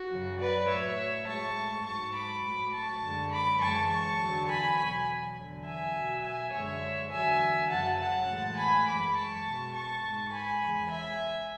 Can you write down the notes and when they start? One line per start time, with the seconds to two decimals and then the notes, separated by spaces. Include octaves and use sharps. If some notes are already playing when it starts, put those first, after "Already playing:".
Already playing: F#4
0.10 F#2 C#3 F#3
0.39 B4 D5
0.68 A2 F#3 C#5 E5
1.27 A2 G#3 A5 C#6
1.85 G#2 F#3 A5 C#6
2.15 B5 D6
2.44 A2 F#3
2.73 A5 C#6
3.02 F#2 D3 G#3
3.31 B5 D6
3.60 F#2 C#3 E3 G#3 A5 C#6
3.90 A5 C#6
4.19 E2 D3 F#3
4.48 G#5 B5
4.77 E2 B2 F#3 G#5 B5
5.36 E2 D3 F#3
5.65 E5 G#5
5.95 B2 F#3
6.23 E5 G#5
6.52 F#2 D3 G#3 C#5 E5
7.11 E2 D3 F#3 E5 G#5
7.69 F#2 C#3 F#3 F#5 A5
7.99 F#5 A5
8.28 A2 E3 G#3
8.57 G#5 B5
8.86 F#2 E3 G#3 B5 D6
9.16 A5 C#6
9.45 B2 G#3
9.74 A5 C#6
10.03 G#2 G#3
10.32 G#5 B5
10.61 E2 C#3 E3 G#3
10.90 E5 G#5